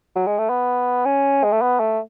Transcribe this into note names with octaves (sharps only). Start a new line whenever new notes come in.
F#3
G#3
A3
B3
C#4
G#3
A3
B3
A3